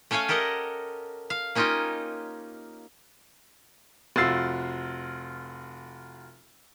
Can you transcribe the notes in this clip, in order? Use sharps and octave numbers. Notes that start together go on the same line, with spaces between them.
A3 C#4 C#5 F5 G#5
G4 A4 A#4 D#5 F#5
F5
A#3 C#4 D#4 F4 G4 D#5
F1 F4 F#4 E6 A6 C7